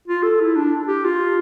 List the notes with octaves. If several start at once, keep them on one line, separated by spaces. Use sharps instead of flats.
F4
A4
E4
D4
G4
F4